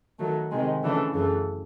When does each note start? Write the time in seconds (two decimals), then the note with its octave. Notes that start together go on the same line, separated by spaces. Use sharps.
0.19 D#3 F#3 A3
0.51 C3 D#3 G#3
0.82 C#3 E3 A3 D4
1.13 F#2 C#3 E3 A3